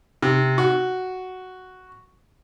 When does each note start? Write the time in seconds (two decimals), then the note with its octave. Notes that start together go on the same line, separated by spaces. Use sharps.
0.22 C3
0.58 F#4